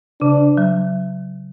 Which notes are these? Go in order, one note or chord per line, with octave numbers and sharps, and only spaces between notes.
C#3 D4
F#3